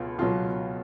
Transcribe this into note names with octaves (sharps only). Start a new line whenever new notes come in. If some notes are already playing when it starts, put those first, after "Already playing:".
Already playing: C#2 B2 F#3 F4
C#2 B2 F#3 F4